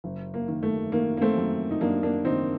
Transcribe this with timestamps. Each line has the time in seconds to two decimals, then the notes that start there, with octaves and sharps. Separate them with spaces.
0.04 F#1
0.34 A#3
0.48 D#3
0.63 A3
0.92 D#3 A#3
1.17 A#3
1.22 A3 C4
1.37 F#2
1.71 D#4
1.81 F#2 A#3 D4
2.03 A#3 D4
2.25 D#3 C4 D#4